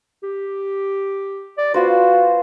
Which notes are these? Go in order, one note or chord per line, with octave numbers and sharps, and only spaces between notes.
G4
D5
B3 F4 F#4 C5